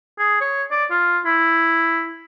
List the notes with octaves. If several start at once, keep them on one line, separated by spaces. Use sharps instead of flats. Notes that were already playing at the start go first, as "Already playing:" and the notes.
G#4
C#5
D5
F4
E4